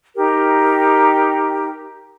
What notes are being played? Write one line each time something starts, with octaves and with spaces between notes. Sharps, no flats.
D#4 G4 A#4